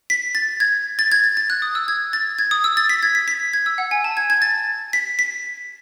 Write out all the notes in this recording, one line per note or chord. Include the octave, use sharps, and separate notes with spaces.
B6
A6
G#6
A6
G#6
A6
A6
F#6
D#6
E6
G#6
A6
G#6
D#6
E6
A6
B6
G#6
B6
B6
G#6
E6
F#5
G#5
A5
G#6
G#6
A6
B6
B6